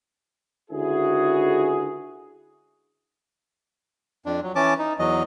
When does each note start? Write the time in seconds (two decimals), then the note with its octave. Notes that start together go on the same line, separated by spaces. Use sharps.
0.70 C#2 D3 E4 F#4 G#4
4.26 F2 D4
4.43 F#3
4.55 E3 C#4 A5 D6
4.79 D#4
4.99 E2 F#3 D#5